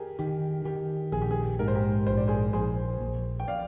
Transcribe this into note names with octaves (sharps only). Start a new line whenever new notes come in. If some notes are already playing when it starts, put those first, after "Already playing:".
Already playing: G4 G#4 A#4
D#3 G4
D#3 G4
A#1 G#4
G4
G#4
G#2 A#4
C5
G4 A#4
A#1 C5
D5
G#4 C5
A#1 G#4 C5
A#1
G5
D5 F5